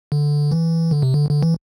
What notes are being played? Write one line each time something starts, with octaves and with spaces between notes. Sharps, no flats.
D3
E3
D3
C3
D3
D3
E3